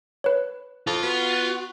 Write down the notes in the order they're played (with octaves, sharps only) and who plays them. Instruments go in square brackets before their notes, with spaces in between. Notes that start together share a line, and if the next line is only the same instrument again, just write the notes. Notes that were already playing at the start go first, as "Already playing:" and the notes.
[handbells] B4 C#5
[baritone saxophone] F2 [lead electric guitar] F4
[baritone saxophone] B3 [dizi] F#4